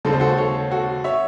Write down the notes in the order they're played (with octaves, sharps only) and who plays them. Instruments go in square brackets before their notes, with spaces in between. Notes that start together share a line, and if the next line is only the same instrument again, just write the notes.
[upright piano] D#2 C#3 G#3 C4 A4
C5
F#4 A4
A4 C#5
F#4 A4
C#5 E5